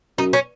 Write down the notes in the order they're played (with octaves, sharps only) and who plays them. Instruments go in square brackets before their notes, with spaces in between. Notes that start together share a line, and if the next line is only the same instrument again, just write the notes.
[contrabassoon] F#2 [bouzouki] D#4
[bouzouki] C#4